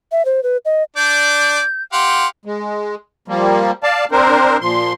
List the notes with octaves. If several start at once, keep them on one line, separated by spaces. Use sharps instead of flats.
E5
C5
B4
D#5
D4 D5 G6
G4 F5 F#5 C6
G#3
F3 G3 A#3
D5 F5 A5
C4 D4 A#4 C5
A#2 F3 C6